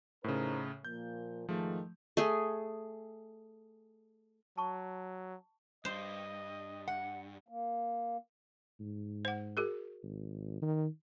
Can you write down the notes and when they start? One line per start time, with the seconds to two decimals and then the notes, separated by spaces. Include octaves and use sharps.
0.24 A2 C#3 D#4 A#4 C5
0.85 A#2 F3 A#3 G6
1.49 G#2 D#3 F3 A3 G#4
2.17 A3 G#4
4.57 F#3 A5 C#6
5.85 G2 C5 D#5
6.88 F#5
7.48 A#3
8.80 G#2
9.25 C5 F#5
9.57 F#4 G#4 A#4
10.03 G#1
10.62 D#3